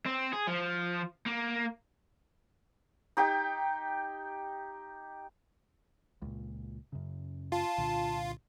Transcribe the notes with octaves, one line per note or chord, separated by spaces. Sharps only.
C4
G#4
F3
A#3
D#4 G4 G5
C#2 A#2
F#2 C#3
F4 A5
C2 A#2 D3